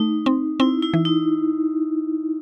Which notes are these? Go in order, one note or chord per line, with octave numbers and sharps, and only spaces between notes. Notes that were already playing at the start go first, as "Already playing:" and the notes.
Already playing: A3 D#4
C4
C4 E4
E4
E3
D#4